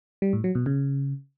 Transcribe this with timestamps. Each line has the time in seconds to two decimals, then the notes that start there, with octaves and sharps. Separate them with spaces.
0.22 G3
0.33 A2
0.44 F#3
0.55 B2
0.66 C#3